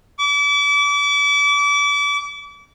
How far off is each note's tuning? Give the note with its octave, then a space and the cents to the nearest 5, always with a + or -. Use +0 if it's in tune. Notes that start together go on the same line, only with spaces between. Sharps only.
D6 -35